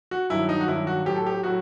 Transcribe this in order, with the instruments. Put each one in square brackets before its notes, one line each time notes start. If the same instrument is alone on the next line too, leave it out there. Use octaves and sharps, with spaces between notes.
[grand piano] F#4
G2 D#3 F#3 E4
D#4
F#4
G2 D#3 F#3 E4
F#4
A2 F#3 G4
A4
G4
A2 F#3 F#4